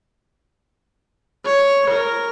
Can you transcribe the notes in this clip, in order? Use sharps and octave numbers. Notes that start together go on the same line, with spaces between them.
C#5
A#4